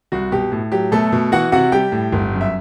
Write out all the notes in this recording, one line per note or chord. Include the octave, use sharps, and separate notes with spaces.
C2 F#4
B2 G4
A2
F#3 G4
B2 A3 A4
B2
E3 F#4 F#5
C3 F#4 F#5
G3 G4 G5
A2
G1
F#2
E5